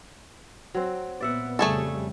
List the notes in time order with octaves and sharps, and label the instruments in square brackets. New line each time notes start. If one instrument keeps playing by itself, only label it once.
[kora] F#3 C4
[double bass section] A#2 B3 [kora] D5 E5 F#5
[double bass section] F2 C#3 G3 [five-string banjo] A3 G#4 A4